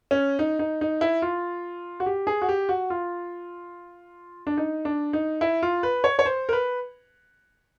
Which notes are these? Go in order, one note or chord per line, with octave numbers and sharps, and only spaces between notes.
C#4
D#4
D#4
D#4
E4
F4
F#4
G4
G#4
F#4
G4
F#4
F4
D4
D#4
D4
D#4
E4
F4
B4
C#5
C#5
C5
A#4
B4